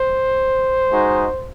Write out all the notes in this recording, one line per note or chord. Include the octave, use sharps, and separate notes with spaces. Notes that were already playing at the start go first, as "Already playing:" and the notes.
Already playing: C5
G#3 D#4 F#4